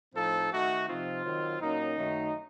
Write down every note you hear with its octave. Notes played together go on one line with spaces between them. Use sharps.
A2 F3 C4 D#4 A4
D#3 A3 D#4 F#4
C3 F3 C4 D#4 F4
D#3 F#3 C4
A#2 F#3 A#3 C#4 D#4
F#2 D#3 F#3 A3